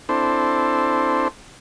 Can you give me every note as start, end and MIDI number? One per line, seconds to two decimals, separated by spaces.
0.09 1.28 60
0.09 1.28 62
0.09 1.28 64
0.09 1.28 69
0.09 1.28 72